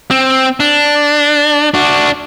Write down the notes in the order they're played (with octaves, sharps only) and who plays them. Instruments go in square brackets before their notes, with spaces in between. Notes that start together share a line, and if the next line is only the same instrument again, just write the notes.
[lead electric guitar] C4
D4
D4 F#4